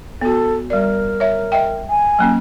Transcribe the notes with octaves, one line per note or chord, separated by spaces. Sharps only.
B3 F#4 A4
G3 A#4 D5
C#5 E5
D#5 E5 G5
G#5
F#3 A#3 C#4